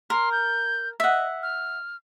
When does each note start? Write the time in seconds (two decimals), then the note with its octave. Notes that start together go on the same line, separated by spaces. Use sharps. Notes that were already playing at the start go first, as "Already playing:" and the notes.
0.10 A#4 C6
0.32 G6
1.00 D#5 E5 F#5
1.42 F6